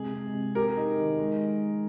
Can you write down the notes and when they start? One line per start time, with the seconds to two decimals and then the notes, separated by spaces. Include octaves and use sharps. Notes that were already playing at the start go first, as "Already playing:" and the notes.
Already playing: C3 G#3 G#4
0.13 G#3
0.34 C3
0.55 G4 A#4
0.77 D#4
0.98 D#3
1.19 G#3